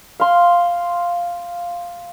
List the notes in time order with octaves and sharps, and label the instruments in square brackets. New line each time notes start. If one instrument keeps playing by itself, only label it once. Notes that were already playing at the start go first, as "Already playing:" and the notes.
[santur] F5 C6